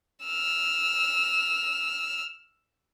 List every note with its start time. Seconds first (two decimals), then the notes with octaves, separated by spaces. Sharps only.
0.25 E6 F6